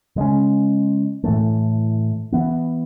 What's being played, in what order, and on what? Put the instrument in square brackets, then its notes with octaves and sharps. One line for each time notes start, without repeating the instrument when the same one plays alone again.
[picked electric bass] C#3 G#3 C#4
A2 E3 A3
E3 B3